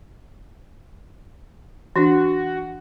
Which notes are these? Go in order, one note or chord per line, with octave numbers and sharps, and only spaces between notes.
E3 D4 F#4